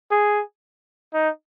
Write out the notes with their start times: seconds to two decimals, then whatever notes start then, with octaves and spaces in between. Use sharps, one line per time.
0.11 G#4
1.13 D#4